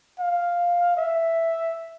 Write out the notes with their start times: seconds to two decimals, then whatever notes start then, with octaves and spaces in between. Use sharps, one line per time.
0.20 F5
0.97 E5